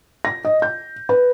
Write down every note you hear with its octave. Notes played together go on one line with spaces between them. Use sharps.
A#6
D#5
G6
B4